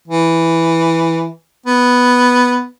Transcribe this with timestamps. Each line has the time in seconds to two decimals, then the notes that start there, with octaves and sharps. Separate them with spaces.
0.08 E3
1.66 B3